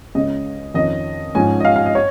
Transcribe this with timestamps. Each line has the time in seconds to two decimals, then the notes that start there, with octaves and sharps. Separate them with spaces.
0.15 C#2 C#3 G#3 C#4 D#5
0.74 F2 D#3 C#4 D#5
1.35 G#2 F3 G#3 C#4 G#5
1.60 D#5
1.65 F5
1.76 F5
1.86 D#5
1.95 C#5